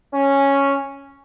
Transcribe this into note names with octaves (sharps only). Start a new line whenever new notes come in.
C#4